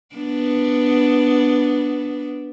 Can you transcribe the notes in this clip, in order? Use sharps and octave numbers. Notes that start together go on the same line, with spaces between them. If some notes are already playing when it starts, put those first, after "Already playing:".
B3 D4